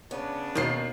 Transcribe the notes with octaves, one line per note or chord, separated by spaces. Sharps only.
C#3 B3 C#4 D4
D#2 B2 D#3 C7